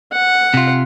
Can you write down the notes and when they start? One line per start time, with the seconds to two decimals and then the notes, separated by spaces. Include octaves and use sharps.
0.12 F#5
0.54 C3 F4